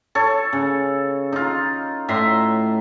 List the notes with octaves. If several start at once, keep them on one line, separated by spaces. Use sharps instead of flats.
A4 C#5
C#3
D#4 F4
A2 E5 A#5 C6